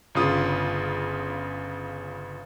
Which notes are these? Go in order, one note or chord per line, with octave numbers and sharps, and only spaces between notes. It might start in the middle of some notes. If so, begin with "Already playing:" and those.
G1 C#3 F4 D#6